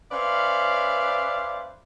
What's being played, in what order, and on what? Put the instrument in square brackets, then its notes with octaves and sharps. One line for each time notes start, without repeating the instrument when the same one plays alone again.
[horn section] C#4 B4 C5 D5 E5 F5